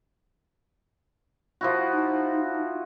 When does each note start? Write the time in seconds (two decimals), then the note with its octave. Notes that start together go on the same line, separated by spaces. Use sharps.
1.61 F3 E4 F#4
1.93 D#4